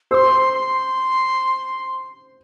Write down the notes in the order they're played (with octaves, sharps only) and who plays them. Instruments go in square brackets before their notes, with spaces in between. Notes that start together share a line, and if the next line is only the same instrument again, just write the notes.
[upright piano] C5 [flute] E6
[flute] C6
C6